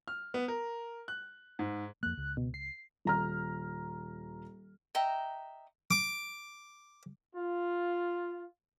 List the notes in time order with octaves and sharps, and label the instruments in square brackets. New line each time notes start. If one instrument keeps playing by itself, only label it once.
[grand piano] F6
B3
A#4
F#6
G#2
[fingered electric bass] F2 A#3 [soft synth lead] F#6
[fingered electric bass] C#2
[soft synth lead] B2
C7
[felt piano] D#1 A#5 F6
[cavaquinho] D#5 E5 G5 A#5
[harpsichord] D6
[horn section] F4